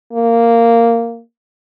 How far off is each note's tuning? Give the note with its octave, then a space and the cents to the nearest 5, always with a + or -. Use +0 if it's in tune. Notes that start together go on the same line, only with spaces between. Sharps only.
A#3 -10